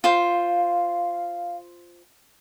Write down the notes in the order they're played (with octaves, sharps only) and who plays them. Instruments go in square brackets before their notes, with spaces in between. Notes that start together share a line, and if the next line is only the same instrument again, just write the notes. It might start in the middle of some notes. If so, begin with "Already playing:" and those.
[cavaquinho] F4 C5 [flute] F5